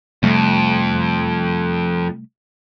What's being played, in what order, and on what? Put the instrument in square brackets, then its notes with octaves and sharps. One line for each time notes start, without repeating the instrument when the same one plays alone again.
[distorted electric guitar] F2 [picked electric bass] C3 G3 A3